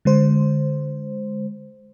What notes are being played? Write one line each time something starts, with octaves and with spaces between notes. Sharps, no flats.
D3 G#3 C5